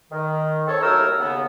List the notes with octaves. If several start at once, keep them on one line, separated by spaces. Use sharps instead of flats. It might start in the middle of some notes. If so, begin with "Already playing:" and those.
D#3
C4 A4 C#5
D#2 A2 F#3 D#4 A#4 E6
D#2 C#3 B3